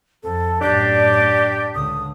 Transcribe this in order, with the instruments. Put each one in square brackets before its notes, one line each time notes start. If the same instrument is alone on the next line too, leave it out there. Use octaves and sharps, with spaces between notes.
[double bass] F2 [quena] A4
[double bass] F#2 A2 [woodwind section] D4 G4 [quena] D5
[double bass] C#2 D3 [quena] D#6